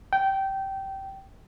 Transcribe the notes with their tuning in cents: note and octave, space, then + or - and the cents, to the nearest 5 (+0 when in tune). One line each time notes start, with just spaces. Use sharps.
G5 -15